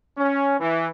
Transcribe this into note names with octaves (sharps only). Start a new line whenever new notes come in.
C#4
E3